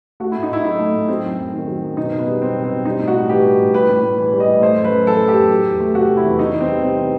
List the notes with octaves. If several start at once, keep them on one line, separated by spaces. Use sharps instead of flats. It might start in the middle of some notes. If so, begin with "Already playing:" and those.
A3 F#4
A2 E4
D#4
A2 E4
F#3 D#4
A3
A2
F#3 C4
F#2
F#2
D#3
F#3
F#2
B2 D#4
B2
B3
G3
G3 C4
B2
C4
B2
G3 D#4
A2
F#4
A2
E3 G4
G3
A2
G3 B4
A2
A2
E3
G3
D#5
A2
A3 C5
F#2
B4
F#2
E3 A4
A3
G4
F#2
F#3
E2
A3
C3 F#4
F#3
E4
E2
E3 D#4
E2
C4
G3
C3 C4
E3